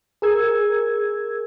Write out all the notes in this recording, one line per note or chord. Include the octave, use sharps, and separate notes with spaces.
G#4 A#4 E6 G#6